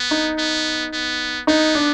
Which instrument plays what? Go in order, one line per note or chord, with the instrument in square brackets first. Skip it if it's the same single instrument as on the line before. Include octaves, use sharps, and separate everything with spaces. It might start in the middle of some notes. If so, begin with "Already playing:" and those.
Already playing: [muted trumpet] B3
[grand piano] D#4
[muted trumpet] B3
B3
[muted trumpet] B3 [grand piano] D#4
[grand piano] D4